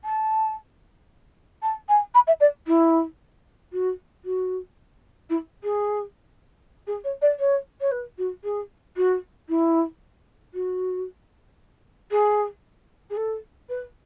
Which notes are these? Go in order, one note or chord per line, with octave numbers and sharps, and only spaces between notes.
A5
A5
G#5
B5
E5
D5
E4
F#4
F#4
E4
G#4
G#4
C#5
D5
C#5
C#5
B4
F#4
G#4
F#4
E4
F#4
G#4
G#4
A4
B4